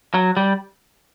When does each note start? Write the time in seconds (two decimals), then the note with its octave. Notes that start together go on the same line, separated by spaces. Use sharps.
0.14 F#3
0.37 G3